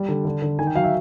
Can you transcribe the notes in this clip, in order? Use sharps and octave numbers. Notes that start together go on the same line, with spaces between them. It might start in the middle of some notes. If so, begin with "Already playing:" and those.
Already playing: G3
D3
D3
D3
D#3 G#5
G5
F#3 F5
E5